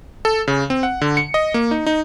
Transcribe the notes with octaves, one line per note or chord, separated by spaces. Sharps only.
A4
C#3
C4
F#5
D3
C#7
D#5
A#3
D#4
D#4